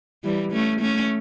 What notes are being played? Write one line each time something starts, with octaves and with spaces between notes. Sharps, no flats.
E3 G3
A3 C#4
A3 C#4